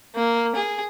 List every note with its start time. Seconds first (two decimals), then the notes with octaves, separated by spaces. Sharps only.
0.16 A#3
0.56 G#4